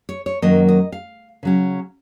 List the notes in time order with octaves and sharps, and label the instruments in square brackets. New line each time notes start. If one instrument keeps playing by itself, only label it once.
[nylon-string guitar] C#5
C#5
F#2 D#3 F#3 A#3 D#5
D#5
F5
C#3 F#3 C#4